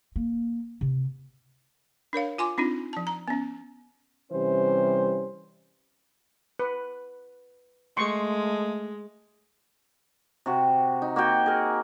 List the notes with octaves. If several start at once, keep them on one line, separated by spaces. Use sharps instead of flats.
A#3
C3
D4 A#4 C#5 F5
F4 G#5 C6 D6
C4 D4 D#4 F4
F3 A5
A#5
B3 C#4
C3 E3 G3 C#4 C5
B4
G#3 A3 C6 C#6
C3 F#4
D#4
A#3 F#4 F#5 G5
G#4 A#4